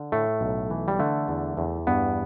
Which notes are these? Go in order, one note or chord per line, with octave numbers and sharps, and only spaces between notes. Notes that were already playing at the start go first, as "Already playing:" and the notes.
Already playing: D3
A2 A3
B1
E3
G3
D3 A3
E2
E2
G2 B3